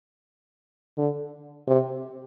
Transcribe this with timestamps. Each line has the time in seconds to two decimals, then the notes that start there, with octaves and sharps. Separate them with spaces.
0.97 D3
1.67 C3